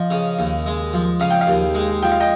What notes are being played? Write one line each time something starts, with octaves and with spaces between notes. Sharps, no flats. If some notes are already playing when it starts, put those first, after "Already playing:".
Already playing: F3 D#5
C#3
D#2
G#3
F3
C#3 F5
G5
F5
D#2
G#3
F3 G5
F5
D#5 G5